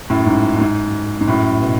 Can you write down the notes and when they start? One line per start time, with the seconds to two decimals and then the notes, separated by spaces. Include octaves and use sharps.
0.10 F#2 A2
0.26 G#2
0.56 F#2
0.61 G#2
1.21 G#2
1.28 F#2 A2
1.62 B2